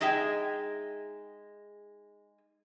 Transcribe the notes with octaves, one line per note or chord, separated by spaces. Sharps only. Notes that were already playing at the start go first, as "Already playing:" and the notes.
G#3 D#4 G#4 E5 G5